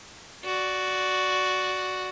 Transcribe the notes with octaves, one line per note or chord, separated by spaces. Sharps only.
F#4 D5